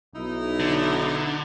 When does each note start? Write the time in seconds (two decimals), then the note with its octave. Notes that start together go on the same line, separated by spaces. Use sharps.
0.16 B1 D#4 E4
0.60 D3